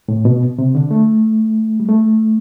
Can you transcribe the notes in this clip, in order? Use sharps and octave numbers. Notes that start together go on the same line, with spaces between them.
A2
B2
C3
D3
A3
G3
A3